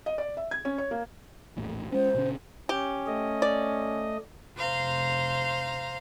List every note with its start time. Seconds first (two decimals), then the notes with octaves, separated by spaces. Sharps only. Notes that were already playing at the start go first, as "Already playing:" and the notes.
0.06 D#5
0.18 D5
0.37 E5
0.51 G#6
0.65 C#4
0.78 C#5
0.91 A#3
1.56 A#1 E2 A2
1.92 G#3 C#4 C5
2.14 A#2 C#3 C#4
2.69 C#4 G4
3.07 A3 D#5
3.42 D5
4.58 F1 C5 F5 A#5